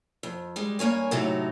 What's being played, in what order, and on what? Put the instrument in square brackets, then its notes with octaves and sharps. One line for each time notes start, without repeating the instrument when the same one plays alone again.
[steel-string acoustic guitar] F2
G3 G#3
G2 A#3 C#5 G#5
A2 C3 F#3 A3 D#4